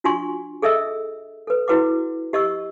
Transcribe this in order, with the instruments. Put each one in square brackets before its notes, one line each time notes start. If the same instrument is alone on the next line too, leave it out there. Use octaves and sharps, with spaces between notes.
[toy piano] D4 F4 F#4 G#5 C6 C#6
G#4 A4 D#5 E5 E6
A4 B4
E4 F#4 B4 F#5 D6
G4 D#5 C#6 E6